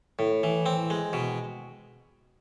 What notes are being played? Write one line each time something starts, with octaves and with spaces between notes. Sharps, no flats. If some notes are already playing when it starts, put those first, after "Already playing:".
A2
E3
C4
G#3
B2